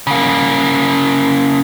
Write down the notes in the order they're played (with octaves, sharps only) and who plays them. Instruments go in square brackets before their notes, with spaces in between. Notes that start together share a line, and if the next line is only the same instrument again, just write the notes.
[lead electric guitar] C#3 A#3